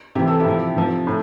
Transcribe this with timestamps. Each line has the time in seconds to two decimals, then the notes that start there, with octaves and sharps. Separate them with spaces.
0.15 C3 E3 G4
0.28 A4
0.40 E4 G4
0.46 C3 F3
0.76 C3 F3
1.07 A2